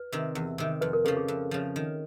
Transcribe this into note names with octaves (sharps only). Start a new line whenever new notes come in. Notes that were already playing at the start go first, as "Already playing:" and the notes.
Already playing: B4
C3 D#3
E2
C3 D#3
F2 B4
A#4
C#3 F3 A4
G#4
F2
C#3 F3
D#3